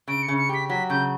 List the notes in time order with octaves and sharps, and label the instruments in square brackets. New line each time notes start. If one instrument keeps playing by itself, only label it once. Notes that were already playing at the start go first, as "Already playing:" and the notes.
[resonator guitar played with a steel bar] C#3 [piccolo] D7
[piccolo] C#7
[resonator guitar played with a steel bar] C#3
[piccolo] C#7
[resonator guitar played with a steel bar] G4 [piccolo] B6
[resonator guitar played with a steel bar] F#3 [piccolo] B6
[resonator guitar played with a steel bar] C#3 [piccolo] G6